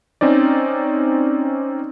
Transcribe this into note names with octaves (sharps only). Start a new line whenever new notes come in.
C4 C#4 D#4 D5